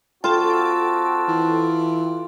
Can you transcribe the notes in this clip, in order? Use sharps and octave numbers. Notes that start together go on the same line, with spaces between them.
C4 F4 F#4 A4 G5 A5
E3